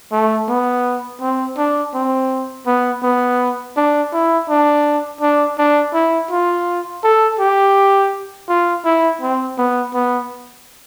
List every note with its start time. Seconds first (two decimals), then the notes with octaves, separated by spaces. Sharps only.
0.12 A3
0.49 B3
1.21 C4
1.57 D4
1.94 C4
2.66 B3
3.03 B3
3.76 D4
4.13 E4
4.49 D4
5.21 D4
5.58 D4
5.94 E4
6.31 F4
7.04 A4
7.39 G4
8.49 F4
8.85 E4
9.22 C4
9.58 B3
9.94 B3